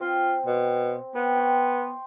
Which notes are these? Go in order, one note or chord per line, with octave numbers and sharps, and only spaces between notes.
C4 F4
B2
B3 G5 C6
G5 C6 C#6